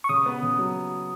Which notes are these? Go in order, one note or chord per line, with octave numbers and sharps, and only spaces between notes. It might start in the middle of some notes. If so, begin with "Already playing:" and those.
C#6
C#3 D#6
B3
C#3
F#3